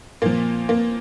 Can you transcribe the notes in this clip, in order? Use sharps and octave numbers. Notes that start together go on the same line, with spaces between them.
A#2 F3 A#3
A#3